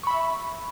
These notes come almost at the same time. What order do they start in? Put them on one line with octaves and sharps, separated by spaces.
C#6 B5 E5